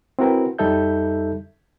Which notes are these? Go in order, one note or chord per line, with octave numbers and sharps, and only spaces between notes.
C4 E4 F#4 A#4 B4
F2 G3 D#4 A4 E5 G6